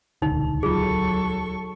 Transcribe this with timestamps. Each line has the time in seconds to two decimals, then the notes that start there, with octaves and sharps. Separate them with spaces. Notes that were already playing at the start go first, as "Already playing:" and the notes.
0.22 D#1 C#2 D3 D#4
0.63 F#3 F4 G#4 A4 C#6